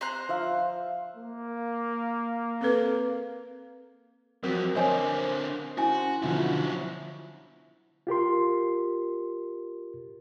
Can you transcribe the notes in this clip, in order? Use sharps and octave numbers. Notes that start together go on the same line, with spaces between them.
C5 A#5 F#6
F3 E5 F5
A#3
C4 A4 B4
F2 F#3 C4 A#4
D3 C4 A#4 C5 C#5 D#5 G#5
C#4 E4 F#4 G#5
C6
B2 D3 F3 F#3 E4
F4 G4 A#4 C6